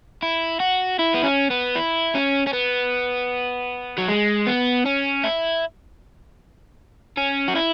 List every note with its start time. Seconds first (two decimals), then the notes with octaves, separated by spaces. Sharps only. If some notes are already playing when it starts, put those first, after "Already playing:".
0.22 E4
0.60 F#4
0.99 E4
1.15 B3
1.24 C#4
1.51 B3
1.76 E4
2.15 C#4
2.47 C#4
2.53 B3
3.98 F#3
4.08 G#3
4.47 B3
4.85 C#4
5.24 E4
7.17 C#4
7.48 F#4
7.55 E4